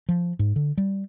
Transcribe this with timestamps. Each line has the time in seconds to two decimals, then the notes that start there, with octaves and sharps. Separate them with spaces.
0.09 F3
0.39 G#2
0.56 D3
0.78 G3